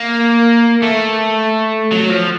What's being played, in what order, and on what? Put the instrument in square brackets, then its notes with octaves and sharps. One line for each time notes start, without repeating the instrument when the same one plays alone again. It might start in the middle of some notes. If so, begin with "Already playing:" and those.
Already playing: [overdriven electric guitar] A#3
A3
F#3
F3